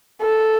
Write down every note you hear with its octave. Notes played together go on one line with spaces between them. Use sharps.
A4